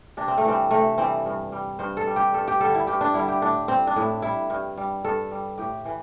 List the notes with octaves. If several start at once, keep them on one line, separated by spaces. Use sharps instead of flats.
C3 D4
C4
A3
E3 G3 C4
C3 A3
E3 G3 C4
G2
G3
G2 C5
A4
G3
G4
G2 A4
G4
D3 G3 A4
E4
G2 G4
D4
D3 G3 E4
G4
A2 D4
G3 C4
D4
A2 E4
G3 E4
G2
G3
G2 A4
G3
A2 G4
E3